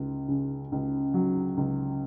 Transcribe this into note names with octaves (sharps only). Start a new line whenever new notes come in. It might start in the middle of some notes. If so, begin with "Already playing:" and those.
Already playing: C#2
C#3
C#2
F#3
C#2